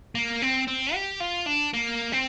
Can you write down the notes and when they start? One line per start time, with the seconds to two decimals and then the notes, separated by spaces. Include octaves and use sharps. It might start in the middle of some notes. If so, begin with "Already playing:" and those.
0.15 A#3
0.42 C4
0.68 C4
0.94 G4
1.20 F4
1.47 D4
1.74 A#3
2.12 C4